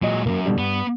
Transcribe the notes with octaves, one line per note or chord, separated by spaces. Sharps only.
A#2 F#3 G#3 D#5
C2 F#2 A#3
B2 D3 G3
G2 B3